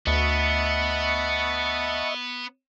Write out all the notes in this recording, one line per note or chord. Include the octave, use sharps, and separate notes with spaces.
D2 B3 D#5 E5 F#5 A5 B5 C#6